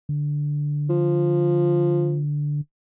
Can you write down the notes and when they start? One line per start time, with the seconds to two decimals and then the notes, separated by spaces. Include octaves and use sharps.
0.09 D3
0.89 F3